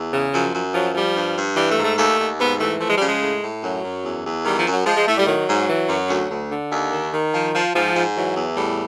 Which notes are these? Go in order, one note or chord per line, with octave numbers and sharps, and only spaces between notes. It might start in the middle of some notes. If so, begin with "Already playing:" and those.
Already playing: E2
C#3
F#2 F3
F#2
F3 F#3
F3 G3
G2
G2
E3 G3
A3
G#2
A3
D#2 A3
D#2
G#2 B3
E3 A3
F3 A3
G#3
G3
C#3
G#3
A2
A2
F#2 F#3
F#2
E2
E2
D#3 G3
F3
F#2
F#3
F3 G#3
G#3
A2 A3
G3
D#3 F#3
G#2
E3
F#2
D2
D2
D3
D#2
D#3
D#3
F3
F3
G#2 F3
G#2
E3 F#3
E2
A2 G3